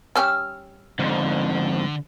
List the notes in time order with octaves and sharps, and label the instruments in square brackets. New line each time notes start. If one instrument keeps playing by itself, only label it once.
[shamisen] G3 C#4 G4 [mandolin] E6 F6
[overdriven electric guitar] F2 G#2 [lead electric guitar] D3